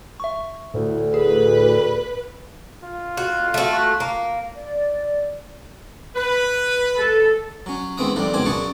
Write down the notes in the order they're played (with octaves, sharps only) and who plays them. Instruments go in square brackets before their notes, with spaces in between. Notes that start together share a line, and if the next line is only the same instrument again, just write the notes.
[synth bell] E5 C#6
[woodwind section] D2 [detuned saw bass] A2
[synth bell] G#4 [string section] B4
[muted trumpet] F4
[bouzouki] F#4
A3 F#4
A#3
[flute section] D5
[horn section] B4
[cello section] A4
[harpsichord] F#3 C#4
D#2 G#3 B3 C4 E5 D#6
F2 A#2 D#3 G3 D4
C#2 B2 D#3 C4 G#5 D6
F#2 C#3 D4 A5 C#6 D#6